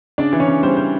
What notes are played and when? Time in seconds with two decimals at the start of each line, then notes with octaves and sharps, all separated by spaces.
0.18 C#3 D4 D5
0.33 E3
0.40 C#4 C#5
0.48 C#3
0.63 G3 C4 C5
0.77 C5